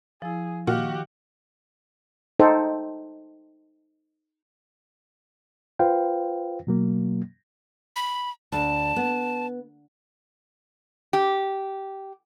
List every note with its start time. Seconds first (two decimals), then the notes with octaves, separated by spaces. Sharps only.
0.22 F3 E4 G#4
0.67 A#2 D#3 F#4 G4 F5 F6
2.39 D#4 A4 C5 G5
5.79 F4 B4 C5 F5 G5
6.67 B2 F#3 A#3
7.96 B5
8.52 D2 A5
8.96 B3
11.13 G4